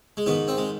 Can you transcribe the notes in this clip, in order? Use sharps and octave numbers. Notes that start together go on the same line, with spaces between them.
G#3
G#2 D#3 B3
C4
G#3